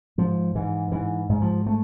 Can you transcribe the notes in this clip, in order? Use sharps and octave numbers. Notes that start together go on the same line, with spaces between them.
G#2 F3
G#2 E3
G#2 E3
G#2
F3
A3